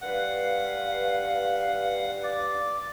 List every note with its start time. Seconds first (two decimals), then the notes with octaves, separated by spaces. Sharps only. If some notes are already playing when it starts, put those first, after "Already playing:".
0.01 G2 B4 F5 F#5
2.23 D5